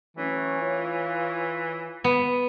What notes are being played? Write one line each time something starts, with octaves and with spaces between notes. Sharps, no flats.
E3 F#3 A3 C#4
F4 C#5
B3